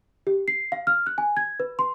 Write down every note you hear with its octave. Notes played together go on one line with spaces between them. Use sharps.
G4
C7
F5
F6
F#6
G#5
G#6
B4
C6